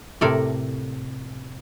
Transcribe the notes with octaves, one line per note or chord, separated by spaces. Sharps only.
A2 C3 A4 A#4 D5